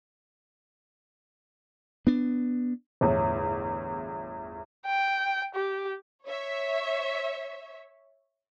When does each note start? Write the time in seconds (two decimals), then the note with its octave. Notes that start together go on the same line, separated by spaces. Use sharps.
2.07 B3 D4
3.01 G1 E2 A2
4.86 G5
5.55 G4
6.25 C#5 E5